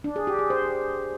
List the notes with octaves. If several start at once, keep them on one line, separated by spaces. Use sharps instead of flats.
D4
G#4
G4
G#4
C5